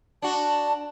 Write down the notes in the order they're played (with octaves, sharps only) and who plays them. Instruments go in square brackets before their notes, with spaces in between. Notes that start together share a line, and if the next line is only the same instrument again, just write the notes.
[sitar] D4 F#4 [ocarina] A5